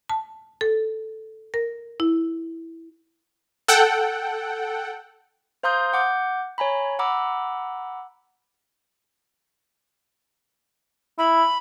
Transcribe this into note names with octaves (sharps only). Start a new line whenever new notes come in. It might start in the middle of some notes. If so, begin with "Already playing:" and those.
A5
A4
A#4
E4
A4 F#5 G5
C5 F5 A#5 C6 D#6 G6
F#5 D6 G6
C#5 G#5 A#5 B5
F#5 A#5 B5 D6 E6
E4 B5